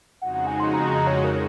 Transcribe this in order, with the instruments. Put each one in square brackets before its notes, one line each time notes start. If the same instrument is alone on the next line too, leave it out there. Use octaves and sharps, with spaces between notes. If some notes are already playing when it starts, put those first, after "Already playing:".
[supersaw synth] F2 C#3 G#3 D#4 F#4 [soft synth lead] F#5
[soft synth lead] F#5
G#5
C6
A#5
A#5
C#5
A#4